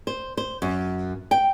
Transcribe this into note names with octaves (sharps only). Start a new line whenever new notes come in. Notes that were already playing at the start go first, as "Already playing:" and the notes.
C5
C5
F#2
G5